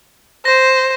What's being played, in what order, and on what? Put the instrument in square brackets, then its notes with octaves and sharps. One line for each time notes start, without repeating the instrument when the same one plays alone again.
[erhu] C5 [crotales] A#6